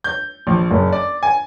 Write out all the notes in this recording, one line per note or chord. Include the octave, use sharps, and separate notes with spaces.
G6
A#1
F#1
D5
G#5